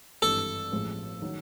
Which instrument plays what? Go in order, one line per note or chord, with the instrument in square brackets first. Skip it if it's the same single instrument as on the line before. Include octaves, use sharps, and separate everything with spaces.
[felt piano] G#1 G2 E3 [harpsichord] A4
[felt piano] A1 A2 F3 G#3
D#3 F#3